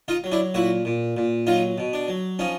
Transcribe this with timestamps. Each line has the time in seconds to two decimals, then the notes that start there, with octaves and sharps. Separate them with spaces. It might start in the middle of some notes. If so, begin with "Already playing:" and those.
0.08 D#4 F4
0.24 F#3
0.32 D4 E4
0.54 A#2 E4 F#4
0.85 A#2
1.17 A#2
1.47 F#3 D#4 F4
1.78 B2
1.93 D4
2.08 F#3
2.39 F3 C#4 D#4